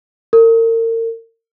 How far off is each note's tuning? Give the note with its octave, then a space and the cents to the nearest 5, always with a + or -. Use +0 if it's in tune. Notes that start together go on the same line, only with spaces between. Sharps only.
A#4 -40